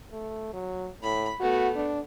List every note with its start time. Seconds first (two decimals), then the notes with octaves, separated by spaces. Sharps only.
0.12 A3
0.53 F#3
1.03 A2 B5
1.40 A3 B3 F#4
1.76 D4